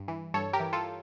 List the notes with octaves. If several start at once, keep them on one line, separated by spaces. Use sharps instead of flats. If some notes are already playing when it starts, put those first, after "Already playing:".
Already playing: G2
E3
G2 A4 C#5
G4 A#4
E3
F4 A4